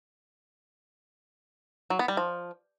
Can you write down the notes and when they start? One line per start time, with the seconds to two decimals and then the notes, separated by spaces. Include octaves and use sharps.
1.90 F#3
1.99 B3
2.08 G3
2.17 F3